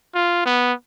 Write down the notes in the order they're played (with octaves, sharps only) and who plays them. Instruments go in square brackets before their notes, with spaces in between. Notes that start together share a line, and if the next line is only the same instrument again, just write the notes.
[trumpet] F4
B3